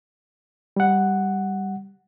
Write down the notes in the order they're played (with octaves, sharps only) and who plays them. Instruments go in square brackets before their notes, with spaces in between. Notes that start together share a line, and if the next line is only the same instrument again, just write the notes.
[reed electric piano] G3 F#5